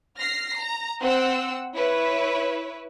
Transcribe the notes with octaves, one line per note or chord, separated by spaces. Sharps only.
F6 A#6 C7
A#5
C4 F#5 E6
E4 B4 C#5